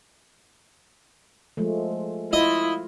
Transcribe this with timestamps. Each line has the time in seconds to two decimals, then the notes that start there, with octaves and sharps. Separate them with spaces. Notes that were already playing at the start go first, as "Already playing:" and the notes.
1.57 F3 G#3 A3
2.33 E4 F4 D#5